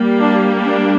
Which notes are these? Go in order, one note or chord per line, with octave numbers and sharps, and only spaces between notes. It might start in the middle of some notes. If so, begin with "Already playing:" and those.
Already playing: G3 A#3
D4
D4